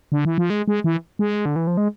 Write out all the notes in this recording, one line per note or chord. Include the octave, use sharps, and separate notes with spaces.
D3
E3
F3
G#3
G#3
E3
G#3
D3
E3
F3
G#3